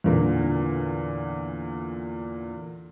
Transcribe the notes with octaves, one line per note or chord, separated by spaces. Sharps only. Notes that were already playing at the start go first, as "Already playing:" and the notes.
E2 A#2 D3